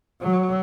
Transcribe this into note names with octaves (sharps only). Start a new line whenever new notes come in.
F#3